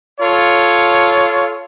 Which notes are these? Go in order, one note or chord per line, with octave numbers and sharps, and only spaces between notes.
F4 A4 C#5